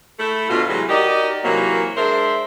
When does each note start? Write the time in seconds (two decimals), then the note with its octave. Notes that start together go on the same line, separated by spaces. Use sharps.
0.20 A3 E4 A4
0.50 D2 B2 A3 F4
0.69 C3 E3 F#3 G#3 A3
0.89 D#4 F#4 G4 A#4 D5 D#5
1.44 C3 E3 F#3 A#3
1.97 G#3 D4 A#4 C5 E5